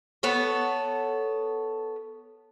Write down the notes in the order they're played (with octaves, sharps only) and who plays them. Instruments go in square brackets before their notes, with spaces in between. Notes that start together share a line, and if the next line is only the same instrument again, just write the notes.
[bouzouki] B3 A4 C#5